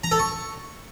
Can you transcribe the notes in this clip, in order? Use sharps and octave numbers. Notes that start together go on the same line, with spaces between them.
A#5
A4
C#6